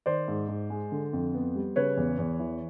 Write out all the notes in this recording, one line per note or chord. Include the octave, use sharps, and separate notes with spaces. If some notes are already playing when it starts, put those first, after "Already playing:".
D#3 C5 D5
G#2
G#2
G#3
D3
F2
B3
G3
C#3 B4 C#5
E2
E2
E3